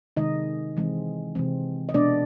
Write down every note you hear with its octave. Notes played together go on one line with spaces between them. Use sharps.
C3 D#3 G#3 D#4 D#5
C3 E3 G#3 C4
C3 E3 G#3 C4
D#5
B2 G#3 B3 D4 D5